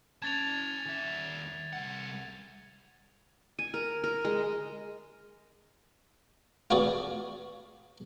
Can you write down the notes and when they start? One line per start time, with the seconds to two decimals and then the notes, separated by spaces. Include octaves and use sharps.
0.22 C#4 A5 G#6 A6 F7
0.86 D#2 E5
1.73 C2 F#5
3.59 G#5
3.74 A#4
4.04 A#4
4.25 G#3
6.70 F4 F#4 G#4 B4 D5